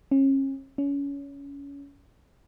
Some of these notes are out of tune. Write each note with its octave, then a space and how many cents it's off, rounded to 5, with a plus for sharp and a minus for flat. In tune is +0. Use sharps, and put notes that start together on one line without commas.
C#4 -35
C#4 +25